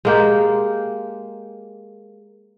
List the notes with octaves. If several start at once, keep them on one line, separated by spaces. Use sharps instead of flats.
G#3 A#3 G4